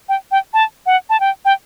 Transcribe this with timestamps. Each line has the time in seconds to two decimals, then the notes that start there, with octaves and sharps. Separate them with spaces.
0.09 G5
0.31 G5
0.54 A5
0.86 F#5
1.10 A5
1.20 G5
1.45 G5